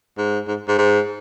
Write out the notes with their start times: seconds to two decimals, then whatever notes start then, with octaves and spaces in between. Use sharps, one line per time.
0.18 G#2
0.48 G#2
0.68 G#2
0.78 G#2